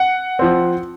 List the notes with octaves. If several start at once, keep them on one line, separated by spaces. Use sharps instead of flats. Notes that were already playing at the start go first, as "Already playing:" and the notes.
Already playing: F#5
F3 C4